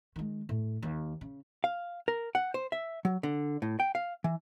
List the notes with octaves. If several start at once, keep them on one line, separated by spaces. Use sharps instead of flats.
D#3 G#3
A2
D#2
C#3
F5
A#4
F#5
C5
E5
F#3
D3
A2
G5
F5
E3